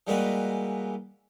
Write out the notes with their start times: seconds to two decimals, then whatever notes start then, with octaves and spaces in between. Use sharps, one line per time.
0.07 E3 G3 G#3 A#3 F#4 B4